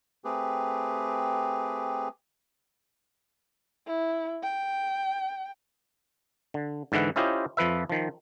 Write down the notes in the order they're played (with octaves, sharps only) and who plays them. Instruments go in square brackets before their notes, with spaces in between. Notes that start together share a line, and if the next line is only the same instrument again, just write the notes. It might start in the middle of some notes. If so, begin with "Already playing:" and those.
[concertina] A3 C4 G4 G#4 B4
[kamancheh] E4
G5
[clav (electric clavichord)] D3
G#2 D3 E3 E4 F#5
C#4 E4 F4 G4 C5 D#5
F2 F3 B4 E5
D#3 F3